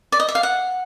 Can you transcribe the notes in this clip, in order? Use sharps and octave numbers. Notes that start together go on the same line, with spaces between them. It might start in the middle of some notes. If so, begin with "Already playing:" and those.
D5
D#5
E5
F5
F#5